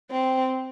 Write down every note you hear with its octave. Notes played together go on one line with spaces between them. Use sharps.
C4